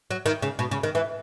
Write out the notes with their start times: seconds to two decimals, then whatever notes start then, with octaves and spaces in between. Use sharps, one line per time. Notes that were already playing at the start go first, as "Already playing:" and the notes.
0.11 F#3
0.26 D#3
0.42 C#3
0.59 B2
0.71 C#3
0.83 D#3
0.95 E3